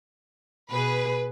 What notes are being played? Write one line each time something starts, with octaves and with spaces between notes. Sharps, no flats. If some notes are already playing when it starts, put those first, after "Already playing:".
B2 G#4 B4